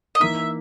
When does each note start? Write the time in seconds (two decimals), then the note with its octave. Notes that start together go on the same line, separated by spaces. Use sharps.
0.15 D#5
0.20 E3 A#3 D#4 E5